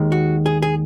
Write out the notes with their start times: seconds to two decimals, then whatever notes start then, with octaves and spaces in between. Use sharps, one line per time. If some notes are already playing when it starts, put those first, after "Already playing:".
Already playing: D#2 D#3 G#3
0.12 F#4
0.46 G#4
0.62 G#4